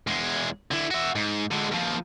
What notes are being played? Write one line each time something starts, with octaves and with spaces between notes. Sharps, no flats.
E2 G#3
D3 E4
F#4 E5
G#2
D3 G#3
D#2 F3